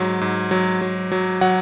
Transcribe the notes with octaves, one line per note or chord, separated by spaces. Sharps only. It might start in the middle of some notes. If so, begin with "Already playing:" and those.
Already playing: G#2 F#3
G#2
F#3
F#3
F#3
F#3 F#5